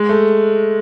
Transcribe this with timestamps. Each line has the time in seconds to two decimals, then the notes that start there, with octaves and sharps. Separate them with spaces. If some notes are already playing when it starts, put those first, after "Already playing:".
Already playing: G#3
0.09 A3